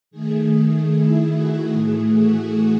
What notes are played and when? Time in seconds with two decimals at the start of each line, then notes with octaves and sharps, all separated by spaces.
0.11 D#3 A3 G#4
0.92 E4
1.31 F#4
1.72 A2 E3 A3 G#4
2.12 F#4